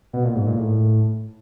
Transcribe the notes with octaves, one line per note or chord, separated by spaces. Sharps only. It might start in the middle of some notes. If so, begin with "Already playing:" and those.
B2
A#2
G#2
A#2
A2